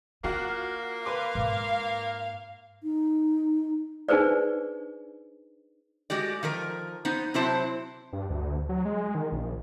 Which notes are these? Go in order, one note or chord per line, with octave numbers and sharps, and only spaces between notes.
A#3 D4 F4 F#4 F5
B4 F5 C6 D6
G#2 D#4
D#4
D4 D#4 G#4 B4 C5 D5
G#3 F#4 G4 D5
D#3 F3 A#4
B3 D#4 C5
C3 F#3 C4 E4 C5 A5
G2
D2
F#3
G#3
D#3
A#1